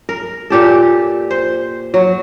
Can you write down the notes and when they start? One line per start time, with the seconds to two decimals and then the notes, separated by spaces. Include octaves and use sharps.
0.09 A#4
0.50 A#2 G4 A4
1.31 C5
1.94 F#3